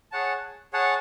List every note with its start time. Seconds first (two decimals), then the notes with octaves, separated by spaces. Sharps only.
0.12 G#4 C#5 F#5 A5
0.73 G#4 C#5 F#5 A5